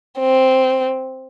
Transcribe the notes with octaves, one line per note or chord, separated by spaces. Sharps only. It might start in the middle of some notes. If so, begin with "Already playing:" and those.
C4